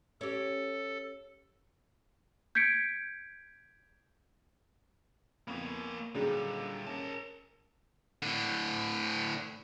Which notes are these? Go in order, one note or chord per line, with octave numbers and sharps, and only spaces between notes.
C#4 G4 A4
G6 G#6 B6 C#7 D7
F2 A#3 B3 C#5
A#2 D3 F#3 G3 G#4
C#4 A#4 A5
A2 D3